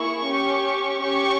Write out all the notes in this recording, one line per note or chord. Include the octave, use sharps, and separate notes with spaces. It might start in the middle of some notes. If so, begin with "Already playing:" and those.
Already playing: A#3 E4 G#4 C#6
C#4 G4
C#4 G4 C#6